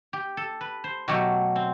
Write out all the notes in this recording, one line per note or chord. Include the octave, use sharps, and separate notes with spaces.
G4
A4
B4
C5
B2 F#3 A3 G4
C4